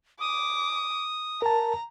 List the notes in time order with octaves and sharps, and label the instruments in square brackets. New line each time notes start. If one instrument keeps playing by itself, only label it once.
[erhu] D6 [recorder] D#6
[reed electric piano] A#4 A5 [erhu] A#5